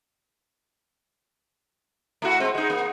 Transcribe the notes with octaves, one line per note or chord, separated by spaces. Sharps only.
A3 E4 F#4
G#3 C4
G#3 D#4
A#3